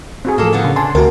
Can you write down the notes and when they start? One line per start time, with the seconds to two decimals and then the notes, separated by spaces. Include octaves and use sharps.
0.25 C4 F#4 G#4
0.38 A2 F3 A#3 A4
0.53 D3 A#3 B3
0.64 C#3
0.76 D3 G#5 A5 C6
0.95 D2 C3 F#4 A#4